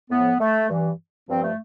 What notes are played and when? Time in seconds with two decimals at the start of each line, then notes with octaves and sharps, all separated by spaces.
0.10 A2 F3 B3
0.40 A3
0.69 G2 E3
1.28 G2 F3 C4
1.43 A3